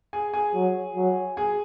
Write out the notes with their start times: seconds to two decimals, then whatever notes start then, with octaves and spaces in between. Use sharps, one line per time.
0.13 G#4 G#5
0.33 G#4 G#5
0.54 F#3
0.96 F#3
1.37 G#4 G#5